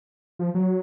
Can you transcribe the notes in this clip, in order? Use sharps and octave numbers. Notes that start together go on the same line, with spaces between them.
F3
F#3